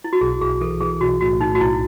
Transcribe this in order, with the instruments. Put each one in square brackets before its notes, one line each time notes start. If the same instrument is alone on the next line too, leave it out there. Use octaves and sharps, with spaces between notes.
[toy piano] E4
F#4
[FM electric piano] B1 [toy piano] G#4
[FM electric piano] B1 [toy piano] G#4
[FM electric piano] E3 [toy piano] A4
[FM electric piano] E3 [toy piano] G#4
[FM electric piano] B1 [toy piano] F#4
[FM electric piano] A2 [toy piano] F#4
[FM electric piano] A2 [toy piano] D#4
[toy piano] F#4
[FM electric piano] B1 [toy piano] E4